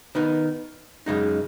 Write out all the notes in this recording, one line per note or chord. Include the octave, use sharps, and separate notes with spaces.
D#3 B3 D#4
F#2 C#3 G#3 D#4